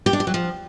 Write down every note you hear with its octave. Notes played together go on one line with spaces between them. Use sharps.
G4
D4
G4
F#3
F3